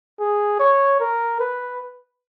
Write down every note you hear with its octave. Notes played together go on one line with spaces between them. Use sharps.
G#4
C#5
A#4
B4